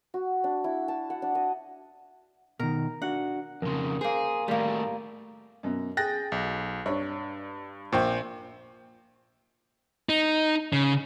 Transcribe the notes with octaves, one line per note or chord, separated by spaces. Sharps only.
F#4
D4
E4
A5
F#5
D4
D#5
B2 D#3 A#4
D4 F#4 F#5
F2 C#3 A#4 C6
A#3 G#4 C5
A2 D#3 G3 A#3
F#2 B2
G#4 G5 F#6 A6 A#6
B1
G2 D4 C#5
A#1 A#2 C5 G5 C#6
D#4
C#3